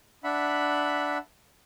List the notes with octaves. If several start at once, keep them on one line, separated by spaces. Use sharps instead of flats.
D4 E5 F#5 B5